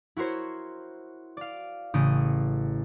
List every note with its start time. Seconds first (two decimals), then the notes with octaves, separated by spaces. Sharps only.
0.17 E4 F#4 A#4 C5 C#5
1.37 D5 F5
1.94 A1 C#3 D#6 G6 D7